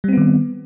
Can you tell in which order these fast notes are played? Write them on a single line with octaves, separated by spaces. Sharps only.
G3 C4 B3 D#3